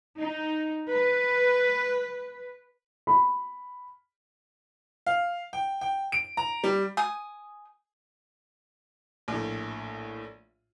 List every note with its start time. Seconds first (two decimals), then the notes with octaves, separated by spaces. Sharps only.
0.17 D#4
0.90 B4
3.07 B5
5.06 F5
5.53 G5
5.81 G5
6.12 D7
6.37 A#5
6.64 G3
6.97 G#5 D#6
9.28 A#1 A2